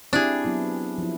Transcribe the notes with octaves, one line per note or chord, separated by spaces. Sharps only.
C4 D4 E4 G4 G#4
F#3 B3 E4
F3 E4